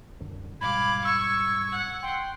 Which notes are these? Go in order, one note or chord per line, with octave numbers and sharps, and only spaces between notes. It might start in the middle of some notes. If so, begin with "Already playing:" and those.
C2 F#2 D3
G#2 B2 G3 F5 B5 D6 G#6
C#6 E6 G#6
F#5
G5 C6